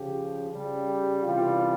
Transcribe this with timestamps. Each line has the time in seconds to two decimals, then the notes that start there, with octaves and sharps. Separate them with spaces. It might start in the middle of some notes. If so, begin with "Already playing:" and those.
Already playing: C#3 F3 G4
0.50 C#3 G3
0.86 G4
1.22 C3 E3 G3 F4